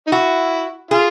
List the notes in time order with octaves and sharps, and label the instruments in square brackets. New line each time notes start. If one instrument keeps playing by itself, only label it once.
[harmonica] D#4
[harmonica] E4 [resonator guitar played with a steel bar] F#4
[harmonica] F4 [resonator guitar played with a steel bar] G#4